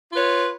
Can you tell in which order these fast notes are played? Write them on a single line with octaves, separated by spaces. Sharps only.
F4 B4 C#5